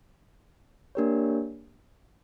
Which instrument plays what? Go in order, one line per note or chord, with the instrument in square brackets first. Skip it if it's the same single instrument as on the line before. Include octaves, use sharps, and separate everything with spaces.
[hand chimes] A#3 D4 G4 A#4 C#5